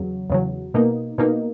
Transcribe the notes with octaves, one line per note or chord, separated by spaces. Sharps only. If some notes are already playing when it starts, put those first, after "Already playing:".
Already playing: E2 C#3 F#3
E2 C#3 F#3
B2 A#3 D#4
B2 A#3 D#4